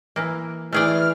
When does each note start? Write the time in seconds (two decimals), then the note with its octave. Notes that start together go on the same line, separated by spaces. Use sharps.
0.16 E3 A#3
0.73 E3 A3 G#4 D5 F6